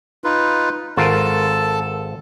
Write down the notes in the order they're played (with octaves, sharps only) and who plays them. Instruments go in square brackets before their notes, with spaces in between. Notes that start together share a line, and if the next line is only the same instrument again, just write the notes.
[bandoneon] D#4 F4 B4
[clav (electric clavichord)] G#1 F4 A#4 [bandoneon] A4 A5